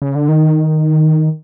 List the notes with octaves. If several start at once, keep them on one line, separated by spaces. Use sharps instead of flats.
C#3
D3
D#3